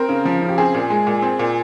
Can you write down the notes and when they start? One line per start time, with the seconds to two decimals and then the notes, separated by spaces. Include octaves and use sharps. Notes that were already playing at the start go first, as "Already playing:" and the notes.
Already playing: C4 A#4
0.09 C#3
0.25 F3
0.42 C#3
0.49 G4
0.58 C4 G#4
0.74 A#2
0.90 G#3
1.07 A#2
1.22 C4
1.39 A#2